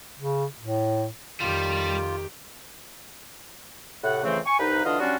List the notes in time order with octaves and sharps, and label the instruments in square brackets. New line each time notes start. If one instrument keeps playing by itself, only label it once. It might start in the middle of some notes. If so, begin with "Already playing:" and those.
[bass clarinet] C#3
A2
[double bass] F2 D#3 [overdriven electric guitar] G3 [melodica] F4 [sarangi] G4
[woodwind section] A2 C3 F#5
F2 C#3 E3 A3 C4
G#5 C#6
C2 D#4 B4
D3 E3 D4 F4 D#5 F5
F#3 G3 C#4 D4 F4 F#4